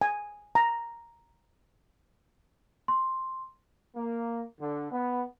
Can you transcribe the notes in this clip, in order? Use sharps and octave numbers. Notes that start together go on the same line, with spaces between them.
G#5
A#5
C6
A#3
D3
B3